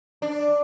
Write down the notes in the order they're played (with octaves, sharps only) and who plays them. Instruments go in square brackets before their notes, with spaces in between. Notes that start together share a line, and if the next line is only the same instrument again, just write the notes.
[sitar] D4